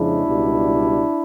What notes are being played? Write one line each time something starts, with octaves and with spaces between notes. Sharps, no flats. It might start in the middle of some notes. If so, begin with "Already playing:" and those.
Already playing: F2 C#3 F3 G#3 D4 E4
C#2 B2 G3